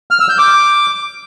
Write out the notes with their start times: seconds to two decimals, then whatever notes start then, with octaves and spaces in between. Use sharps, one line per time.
0.11 F6
0.20 E6
0.29 G6
0.38 D6